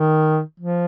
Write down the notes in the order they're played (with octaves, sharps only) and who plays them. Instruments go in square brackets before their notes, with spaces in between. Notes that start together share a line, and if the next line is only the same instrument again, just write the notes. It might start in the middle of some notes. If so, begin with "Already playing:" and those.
Already playing: [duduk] D#3
F3